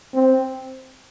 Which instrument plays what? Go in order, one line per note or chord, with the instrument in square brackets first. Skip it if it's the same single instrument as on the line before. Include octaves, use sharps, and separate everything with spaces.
[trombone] C4